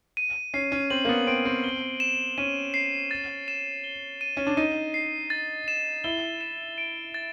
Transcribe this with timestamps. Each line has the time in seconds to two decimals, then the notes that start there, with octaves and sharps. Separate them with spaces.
0.17 D#7
0.54 C#4 C7
0.72 C#4
0.90 C4 F#7
1.05 A#3
1.09 B3
1.27 C4 D7
1.45 C4
1.64 G7
2.00 E7
2.38 C#4 D#7
2.74 C7
3.11 A6
3.48 E7
3.84 G7
4.21 D#7
4.37 C#4
4.47 D4
4.57 D#4 D#7
4.94 C7
5.30 A6
5.68 E7
6.04 E4 G7
6.41 E7
6.78 D7
7.14 A6